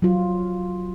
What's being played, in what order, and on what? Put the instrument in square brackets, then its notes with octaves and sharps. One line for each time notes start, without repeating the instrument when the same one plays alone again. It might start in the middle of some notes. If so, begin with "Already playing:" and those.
[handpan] F#3 F4